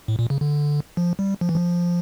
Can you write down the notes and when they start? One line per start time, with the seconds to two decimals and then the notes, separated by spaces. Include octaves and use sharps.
0.08 A2
0.19 A#2
0.30 C#3
0.41 D3
0.97 F3
1.19 G3
1.41 F3
1.49 E3
1.55 F3